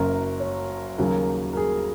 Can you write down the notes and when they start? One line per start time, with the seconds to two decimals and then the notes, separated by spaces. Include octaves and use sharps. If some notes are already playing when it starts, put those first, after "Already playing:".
Already playing: F#1 F#2 F#3 A#4
0.40 C#5
0.98 D#2 C#3 F#3 A#4
1.53 A#4
1.57 G#4